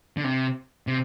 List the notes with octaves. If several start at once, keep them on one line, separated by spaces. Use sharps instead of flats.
D3
C3
C3